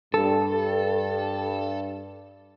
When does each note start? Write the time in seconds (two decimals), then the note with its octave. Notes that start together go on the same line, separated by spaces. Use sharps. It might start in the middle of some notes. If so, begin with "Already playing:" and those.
0.14 G2 A4